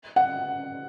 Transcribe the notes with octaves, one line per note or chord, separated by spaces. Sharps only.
F#5